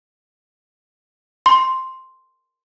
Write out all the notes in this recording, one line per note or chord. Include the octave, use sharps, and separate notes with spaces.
C6